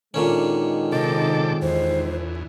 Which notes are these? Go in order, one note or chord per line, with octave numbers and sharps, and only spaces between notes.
A#2 D3 D#3 G#3 C#4
C3 A4 D#5 D6
E2 C5